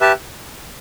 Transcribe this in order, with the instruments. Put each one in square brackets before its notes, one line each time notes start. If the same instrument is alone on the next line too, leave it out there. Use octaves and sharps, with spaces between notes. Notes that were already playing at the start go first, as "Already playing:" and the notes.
[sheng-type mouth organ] G4 B4 E5 A5